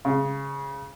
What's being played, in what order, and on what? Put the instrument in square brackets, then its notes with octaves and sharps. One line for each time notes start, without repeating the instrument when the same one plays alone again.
[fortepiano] C#3